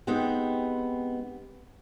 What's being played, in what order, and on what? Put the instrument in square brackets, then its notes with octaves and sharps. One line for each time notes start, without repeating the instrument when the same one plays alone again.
[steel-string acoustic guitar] G#3 B3 C4 D#4 G4